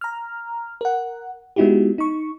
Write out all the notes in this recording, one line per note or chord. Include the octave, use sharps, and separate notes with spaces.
A#5 F6
A#4 F#5
G#3 B3 D#4 E4 F#4 G4
D#4 C#6